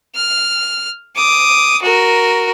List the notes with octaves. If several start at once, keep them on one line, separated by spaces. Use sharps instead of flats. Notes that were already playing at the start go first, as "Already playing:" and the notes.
F6
D6 D#6
F#4 A#4